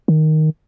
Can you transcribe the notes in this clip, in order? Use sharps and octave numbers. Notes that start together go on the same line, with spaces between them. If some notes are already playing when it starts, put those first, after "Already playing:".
D#3